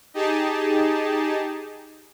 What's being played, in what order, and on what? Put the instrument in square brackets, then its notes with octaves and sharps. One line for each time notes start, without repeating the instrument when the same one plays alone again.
[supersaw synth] D#4 G4 G#4 A5